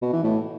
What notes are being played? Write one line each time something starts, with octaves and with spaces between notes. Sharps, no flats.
B2
E3
A2